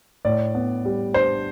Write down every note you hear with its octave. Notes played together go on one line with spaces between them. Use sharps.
A2 D5
B3
G3
D4 C5